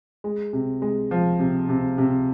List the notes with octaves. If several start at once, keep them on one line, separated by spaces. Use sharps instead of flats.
G#3
C3
G#3
F3
C3
C3
C3